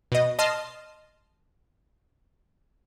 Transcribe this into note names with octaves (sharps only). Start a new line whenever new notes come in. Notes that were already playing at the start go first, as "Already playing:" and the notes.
B2 D#5
D#5 A5 C6 F6